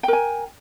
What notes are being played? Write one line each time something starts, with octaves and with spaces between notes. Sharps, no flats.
A#4 G5 G#5